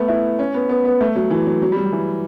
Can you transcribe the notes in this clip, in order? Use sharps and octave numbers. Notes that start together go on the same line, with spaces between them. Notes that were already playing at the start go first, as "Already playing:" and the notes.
Already playing: A3 B3
E4
C#4
B3
B3
B3
A3
F#3
E3
F#3
F#3
G3
F#3
E3